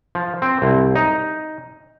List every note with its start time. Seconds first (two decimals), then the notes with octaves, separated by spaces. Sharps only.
0.15 F3
0.42 C4
0.62 C2
0.95 D#4